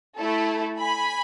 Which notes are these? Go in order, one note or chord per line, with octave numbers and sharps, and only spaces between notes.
A3 E4 A4
G#5 B5